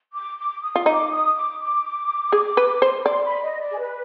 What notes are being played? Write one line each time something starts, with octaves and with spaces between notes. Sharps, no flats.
D6
D6
D#6
F4 D#6
D#4 D6
D#6
D6
D6
G#4
B4
C5
B5
D5 C6
B5
D#5
D5
G#4
B4